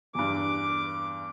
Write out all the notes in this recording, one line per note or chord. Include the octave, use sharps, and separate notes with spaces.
E2 G2 D6